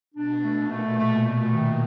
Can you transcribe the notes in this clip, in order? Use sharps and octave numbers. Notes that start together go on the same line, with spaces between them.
B2 D4
A3
A#2
A3
B2 A3
A3
D#3